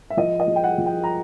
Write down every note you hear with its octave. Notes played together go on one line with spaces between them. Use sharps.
E5
F3 D#5
D#5
F3
G5
F#5
F3
G5
A#5